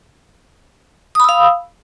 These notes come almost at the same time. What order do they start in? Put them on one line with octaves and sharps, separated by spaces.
D#6 B5 E6 F5